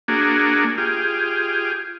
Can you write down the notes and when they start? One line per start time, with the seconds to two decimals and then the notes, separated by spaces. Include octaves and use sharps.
0.08 A#3 D4 F#4 G#4
0.78 F4 G4 G#4